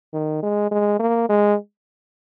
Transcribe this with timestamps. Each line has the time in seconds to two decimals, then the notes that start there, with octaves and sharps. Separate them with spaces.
0.13 D#3
0.43 G#3
0.71 G#3
0.99 A#3
1.29 G#3